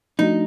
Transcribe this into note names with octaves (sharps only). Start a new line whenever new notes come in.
F3 A3 D4 D#4 F#4